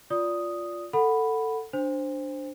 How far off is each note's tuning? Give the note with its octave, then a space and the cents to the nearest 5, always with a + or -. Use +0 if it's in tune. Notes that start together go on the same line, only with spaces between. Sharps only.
F4 +0 D5 -15 D#6 +0
A4 +15 F#5 +0 B5 +0
D4 +0 C5 +0 G#5 -45